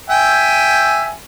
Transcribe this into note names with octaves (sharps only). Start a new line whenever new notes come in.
E5 G5 G#5